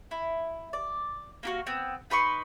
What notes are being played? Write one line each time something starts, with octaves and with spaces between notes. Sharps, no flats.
E4
D5
A#3 E4 F#4
B3 C4
D#4 B4 C6 C#6